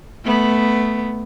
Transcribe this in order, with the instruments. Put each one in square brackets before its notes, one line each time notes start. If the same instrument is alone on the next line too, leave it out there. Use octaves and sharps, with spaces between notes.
[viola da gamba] A3 B3